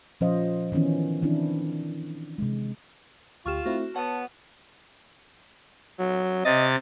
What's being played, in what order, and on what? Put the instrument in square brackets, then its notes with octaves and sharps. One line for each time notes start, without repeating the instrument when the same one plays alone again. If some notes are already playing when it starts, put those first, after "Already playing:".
[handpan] A#2 F3 C#4 C5 D#5 F5
D#3 E3 B3 C#4 E4
D#3 E3 C4 D4 E4
C3 G#3
[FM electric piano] D2 G4 [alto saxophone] F4 [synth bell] C#6 F6 E7
[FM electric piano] A3 C4 E4 [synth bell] F#4
[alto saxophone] B3 [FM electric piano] C#5 [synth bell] F#5 [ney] A5
[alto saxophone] F#3
[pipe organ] C3 A6 [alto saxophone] D#5